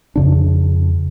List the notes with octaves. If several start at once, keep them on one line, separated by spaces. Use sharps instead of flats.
F2 C#3 D4